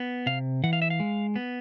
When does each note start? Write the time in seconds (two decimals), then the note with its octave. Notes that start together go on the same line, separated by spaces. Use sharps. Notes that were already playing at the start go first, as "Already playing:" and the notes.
Already playing: B3
0.26 C3 F5
0.64 E3 F#5
0.73 F5
0.82 E5
0.90 F5
1.00 G#3
1.36 B3